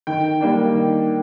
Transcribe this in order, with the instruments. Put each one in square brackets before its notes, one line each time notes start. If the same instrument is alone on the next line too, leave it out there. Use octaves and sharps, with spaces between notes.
[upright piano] D#3 G5
G3 A#3 D4
D#3